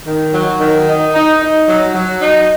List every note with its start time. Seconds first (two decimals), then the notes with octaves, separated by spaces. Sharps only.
0.06 D#3
0.33 F#3
0.60 D#3
0.87 D#4
1.14 D#4
1.41 D#4
1.68 F#3
1.94 F#3
2.22 D#4